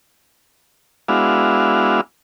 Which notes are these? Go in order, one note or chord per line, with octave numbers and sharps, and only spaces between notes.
G#3 B3 D4 E4 F#4 F5